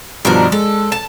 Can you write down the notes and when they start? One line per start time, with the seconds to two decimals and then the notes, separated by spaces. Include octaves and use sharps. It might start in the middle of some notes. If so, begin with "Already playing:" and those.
0.25 G2 B2 D#3 F3 D4 A#4
0.52 G#3 A4
0.92 A5 E7